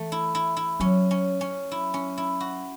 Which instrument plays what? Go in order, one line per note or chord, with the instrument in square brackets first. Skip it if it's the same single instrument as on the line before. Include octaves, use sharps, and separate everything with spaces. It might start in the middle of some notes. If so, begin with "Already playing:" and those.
Already playing: [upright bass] E3 [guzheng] A3
[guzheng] E4
E4
E4
[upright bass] F#3 [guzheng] C#4
[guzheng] C#4
C#4
E4
C#4
E4
F#4